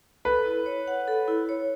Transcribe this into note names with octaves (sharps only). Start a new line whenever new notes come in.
A4 B4
E4
C#5
F#5
A4
E4
C#5